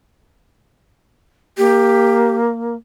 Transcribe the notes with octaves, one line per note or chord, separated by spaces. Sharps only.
A#3 G4